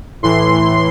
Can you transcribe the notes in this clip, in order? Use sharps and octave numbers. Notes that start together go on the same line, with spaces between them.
A2 E3 C6